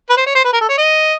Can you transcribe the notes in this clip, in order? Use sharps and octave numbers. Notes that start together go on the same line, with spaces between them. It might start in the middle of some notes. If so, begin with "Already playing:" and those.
B4
C5
C#5
C5
B4
A#4
A4
C#5
D#5